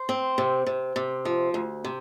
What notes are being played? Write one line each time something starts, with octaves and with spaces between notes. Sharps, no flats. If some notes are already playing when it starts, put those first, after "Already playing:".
Already playing: C5
C4
C3
C3
C3
F3
D2
C3